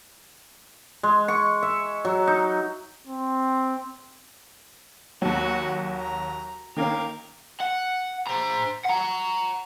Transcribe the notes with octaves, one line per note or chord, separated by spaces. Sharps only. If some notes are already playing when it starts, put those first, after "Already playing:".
G#3
C#6
E5
F#3
D#4
C4
D#2 F#3 F#4
A#5
D#3 A#3 C#4 A#4 F5
F#5
C5 A#5
F#5 A#5